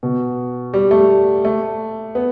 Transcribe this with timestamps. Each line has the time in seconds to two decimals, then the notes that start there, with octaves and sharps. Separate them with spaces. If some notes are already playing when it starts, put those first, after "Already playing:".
0.03 B2
0.74 G3
0.91 A3
1.45 A3
2.15 B3